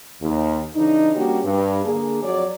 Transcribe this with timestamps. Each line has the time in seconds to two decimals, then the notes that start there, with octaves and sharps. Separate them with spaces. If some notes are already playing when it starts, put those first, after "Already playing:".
0.22 D#2
0.75 C#3 E3 D4 D#4
1.15 G3 A#3 C#4 D4 F#4 G4
1.44 G2
1.86 D3 A#3 D4 G#4
2.23 F2 F#3 C#5 D5